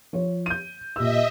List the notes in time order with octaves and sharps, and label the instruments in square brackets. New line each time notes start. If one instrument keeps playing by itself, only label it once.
[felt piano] F3 F4 C#5
G6 D#7
[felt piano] A#2 G4 E6 [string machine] D#5 E5